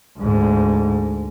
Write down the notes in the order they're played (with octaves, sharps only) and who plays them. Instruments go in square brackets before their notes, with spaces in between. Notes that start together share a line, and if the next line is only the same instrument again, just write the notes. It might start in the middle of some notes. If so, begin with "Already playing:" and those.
[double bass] D2 G#2